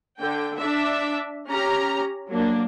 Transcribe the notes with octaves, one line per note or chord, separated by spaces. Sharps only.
D3 G5
D4 E5
C#4 G4 A#5 F6
F#3 A#3 D4